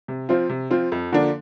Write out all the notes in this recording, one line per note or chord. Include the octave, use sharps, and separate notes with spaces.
C3
F3 C4 F4
C3
F3 C4 F4
F2
D3 F3 A#3 D4